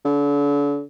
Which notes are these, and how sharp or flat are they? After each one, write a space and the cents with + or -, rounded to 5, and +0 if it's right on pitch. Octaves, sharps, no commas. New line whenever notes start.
D3 -40